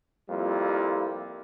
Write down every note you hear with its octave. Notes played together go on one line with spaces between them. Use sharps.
F2 G3 A#3 E4 F4